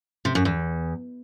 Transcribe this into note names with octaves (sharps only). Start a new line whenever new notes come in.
C3
F#2
E2